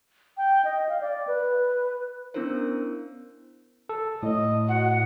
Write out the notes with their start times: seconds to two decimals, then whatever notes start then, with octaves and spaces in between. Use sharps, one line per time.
0.37 G5
0.65 D#5
0.89 F5
1.01 D5
1.27 B4
2.34 B3 C#4 D4 E4 A#4 C5
3.89 A4
4.23 A2 D#5
4.68 F#4 F#5